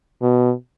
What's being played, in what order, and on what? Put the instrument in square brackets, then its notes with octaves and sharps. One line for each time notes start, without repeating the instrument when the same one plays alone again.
[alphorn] B2